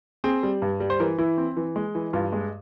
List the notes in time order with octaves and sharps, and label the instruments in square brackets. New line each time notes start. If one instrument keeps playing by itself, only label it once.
[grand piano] C4 G#4
G3
G2
G3
C5
E3 A#4
E3 E4
C4
E3
G#3
E3
G2 F4
G#3